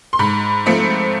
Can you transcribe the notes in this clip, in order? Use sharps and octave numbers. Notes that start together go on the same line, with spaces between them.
C6
G#2 B5
F3 A3 C4